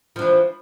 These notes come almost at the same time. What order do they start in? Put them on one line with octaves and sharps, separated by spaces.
F3 D4 E3